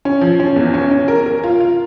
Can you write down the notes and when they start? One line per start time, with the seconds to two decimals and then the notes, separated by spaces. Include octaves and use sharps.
0.05 C#4
0.21 F3
0.40 C#4
0.56 E2
0.74 C#4
0.91 C#4
1.08 A#4
1.26 A#4
1.44 F4
1.60 F4